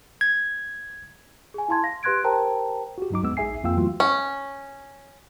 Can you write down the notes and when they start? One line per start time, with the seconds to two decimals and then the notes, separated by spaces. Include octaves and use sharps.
0.21 G#6
1.54 G#4 G#5
1.68 E4 F5 A5 C6 G#6
1.83 F5 A#6
2.03 G4 B4 C6 F#6 G#6 D7
2.24 G4 A#4 C5 G5 A5 A#5
2.98 F#4 G4
3.10 G2 F#3 D#4 D6
3.23 E2 G#3 B3 E6
3.37 A#1 D#4 G#4 E5 G#5 C7
3.64 F2 A#3 F4 F5 G5 E6
3.77 E3 F#3 A3 B3 F4 F#4
4.00 C#4